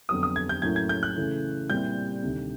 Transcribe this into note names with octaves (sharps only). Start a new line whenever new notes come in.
F2 D3 F#3 B3 D#6
D#6
G#6
G6
A2 F#3 A#3 C#4 E4 G#6
G#6
G6
F#6
C#3 E3 A3
A#2 G3 C4 E4 G6
D2 C3 D#3